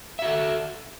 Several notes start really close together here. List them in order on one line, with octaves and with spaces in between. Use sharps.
E5 F#4 A4